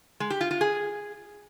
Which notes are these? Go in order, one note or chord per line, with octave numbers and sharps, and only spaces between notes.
G#3
G4
F4
F4
G#4